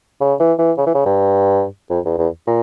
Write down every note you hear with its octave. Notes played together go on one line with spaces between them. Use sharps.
C#3
E3
E3
C#3
E3
C#3
G2
F2
E2
E2
A#2